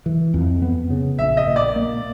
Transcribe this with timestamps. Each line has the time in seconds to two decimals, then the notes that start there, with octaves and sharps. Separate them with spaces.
0.06 E3
0.34 F2
0.62 B3
0.90 C#3
1.18 A#1 E5
1.37 D#5
1.47 A#2
1.56 D5
1.76 A#3